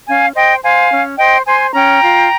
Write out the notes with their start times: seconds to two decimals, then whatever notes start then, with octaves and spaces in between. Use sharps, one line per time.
0.07 C#4 F5 G#5
0.35 C5 D#5 G5
0.63 C5 F5 G#5
0.91 C#4
1.18 C5 D#5 G5
1.46 C5 G#5 C6
1.74 C#4 G5 A#5
2.02 F4